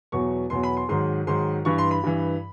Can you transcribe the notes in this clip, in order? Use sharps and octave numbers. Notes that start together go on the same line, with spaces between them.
E2 B2 F#3 C#6
E2 B2 F#3 C6
B5
C6
G#2 D#3 F#3 C6
G#2 D#3 F#3 C6
G2 E3 C#6
C6
B5
G2 E3